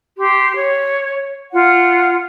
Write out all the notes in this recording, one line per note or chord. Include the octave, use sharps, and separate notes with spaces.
G4 C6
C#5
F4 F#5